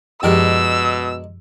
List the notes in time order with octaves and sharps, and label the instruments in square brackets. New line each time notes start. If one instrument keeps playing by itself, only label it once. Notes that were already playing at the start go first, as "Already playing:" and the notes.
[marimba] F#2 F3 G4 [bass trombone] B2 [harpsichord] G#3 D4 A#4 [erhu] E6